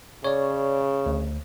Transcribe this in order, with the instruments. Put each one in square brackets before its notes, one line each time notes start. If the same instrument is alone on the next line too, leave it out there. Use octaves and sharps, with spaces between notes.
[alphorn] C#3 [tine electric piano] C#5 D5
[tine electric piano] D2